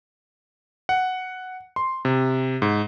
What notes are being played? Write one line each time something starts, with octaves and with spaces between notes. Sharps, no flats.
F#5
C6
C3
G#2